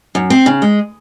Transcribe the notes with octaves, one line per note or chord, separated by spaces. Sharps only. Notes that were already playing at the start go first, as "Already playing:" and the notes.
F#2
C4
C#3
G#3